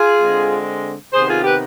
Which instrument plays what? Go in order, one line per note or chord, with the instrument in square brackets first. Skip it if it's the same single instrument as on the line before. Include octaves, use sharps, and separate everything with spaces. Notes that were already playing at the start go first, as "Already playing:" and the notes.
Already playing: [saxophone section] F4 G#4
D3 G#3 C4
C3 D#3 B3 G#4 C5
F4 G#4
G4 B4